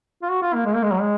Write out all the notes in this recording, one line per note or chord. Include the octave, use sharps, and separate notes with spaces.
F4
F#4
F4
A#3
G#3
A#3
G#3
F#3
G#3